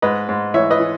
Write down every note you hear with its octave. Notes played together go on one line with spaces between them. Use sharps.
G#2 B4 D#5
G#2
E3 C#5 E5
B4 D#5
E3